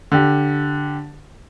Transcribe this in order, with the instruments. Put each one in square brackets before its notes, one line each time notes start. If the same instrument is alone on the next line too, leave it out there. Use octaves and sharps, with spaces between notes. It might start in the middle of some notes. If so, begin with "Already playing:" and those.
[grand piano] D3 G4